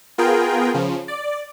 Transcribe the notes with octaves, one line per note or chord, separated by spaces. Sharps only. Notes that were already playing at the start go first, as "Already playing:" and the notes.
B3 F4 G#4 A#4 G5
C#3 F3
D5